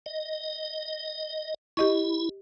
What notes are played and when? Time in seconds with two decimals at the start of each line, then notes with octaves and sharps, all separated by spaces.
0.06 D#5
1.77 E4 G4 D#5 C#6